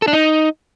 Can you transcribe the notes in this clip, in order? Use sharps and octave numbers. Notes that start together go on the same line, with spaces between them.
A4
D4
D#4